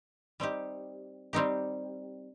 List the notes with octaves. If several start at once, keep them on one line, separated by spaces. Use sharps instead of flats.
G3 C4 D#4 G4
G3 C4 D#4 G4